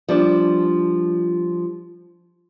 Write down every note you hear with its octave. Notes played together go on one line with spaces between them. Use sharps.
F3 G3 D4